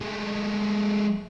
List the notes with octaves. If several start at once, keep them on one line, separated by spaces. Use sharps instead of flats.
G#3 A3